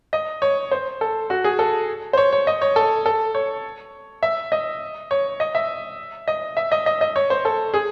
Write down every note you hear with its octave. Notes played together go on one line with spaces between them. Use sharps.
D#5
C#5
C5
A4
F#4
G#4
A4
C5
C#5
C#5
D#5
C#5
A4
A4
C#5
E5
D#5
C#5
D#5
E5
D#5
E5
D#5
D#5
D#5
C#5
C5
A4
G#4